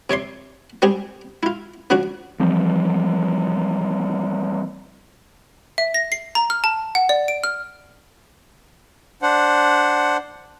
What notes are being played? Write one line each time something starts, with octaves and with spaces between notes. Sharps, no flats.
C3 C#5 D5 C6
G3 C4 G4 G#4
E4 F4
C#3 F3 D4 F#4
E3 F3 G3 C4
E5
A#6
C7
A#5
F6
A5
F#5
D5
D7
F6
D4 C5 F#5